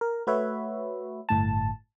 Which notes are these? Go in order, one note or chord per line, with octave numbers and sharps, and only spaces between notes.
A#4
A3 F#4 B4 C#5 E5
G1 A2 A5